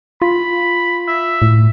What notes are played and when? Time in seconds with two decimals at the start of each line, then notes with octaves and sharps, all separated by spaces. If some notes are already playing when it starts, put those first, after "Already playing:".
0.22 F4 B5
1.08 E5
1.42 A2